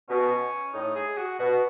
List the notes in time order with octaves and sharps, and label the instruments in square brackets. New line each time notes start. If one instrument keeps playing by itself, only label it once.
[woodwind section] B2 [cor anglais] C#4
[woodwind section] A2 [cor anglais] D#4
[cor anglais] G#4
F#4
[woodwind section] B2 [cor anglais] F#4